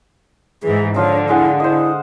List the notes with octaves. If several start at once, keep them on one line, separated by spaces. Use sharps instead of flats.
G#2 E3 G#4
D3 F3 F4 C#5 F5
G#3 E4 F5 F#5
E4 C5 D#5